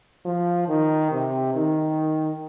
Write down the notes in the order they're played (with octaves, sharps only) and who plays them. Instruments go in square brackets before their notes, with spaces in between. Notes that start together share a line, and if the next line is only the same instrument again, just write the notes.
[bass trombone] F3
D#3
C3
D#3